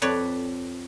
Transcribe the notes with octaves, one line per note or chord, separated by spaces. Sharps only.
F2 B4 C#5 D5